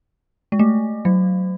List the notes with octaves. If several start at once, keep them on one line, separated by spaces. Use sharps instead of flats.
G#3
A3
F#3